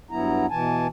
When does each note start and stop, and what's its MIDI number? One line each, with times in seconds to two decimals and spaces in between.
0.11 0.46 43
0.11 0.46 54
0.11 0.46 59
0.11 0.46 64
0.11 0.46 82
0.50 0.87 47
0.50 0.87 52
0.50 0.87 80
0.50 0.87 81